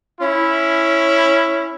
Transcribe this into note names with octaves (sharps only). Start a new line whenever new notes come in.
C#4 E4